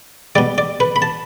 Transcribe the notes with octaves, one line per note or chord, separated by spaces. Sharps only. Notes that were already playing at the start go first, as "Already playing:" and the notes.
B2 G3 D5
D5
B4
B5
A5